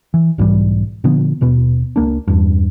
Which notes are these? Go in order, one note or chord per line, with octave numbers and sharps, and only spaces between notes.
E3
B1 G#2 E3 G3
A#2 D3 F3 B3
D#1 B2 B3
C#2 A#3 D4
E2 G2